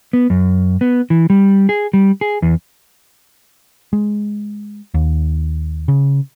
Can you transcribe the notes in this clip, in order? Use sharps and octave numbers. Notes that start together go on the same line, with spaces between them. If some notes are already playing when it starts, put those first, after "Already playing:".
B3
F#2
B3
E3
G3
G#4
G3
G#4
E2
G#3
D#2
C#3